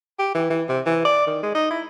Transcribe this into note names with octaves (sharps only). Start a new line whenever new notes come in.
G4
E3
E3
C3
E3
D5
D#3
G#3
D#4
E4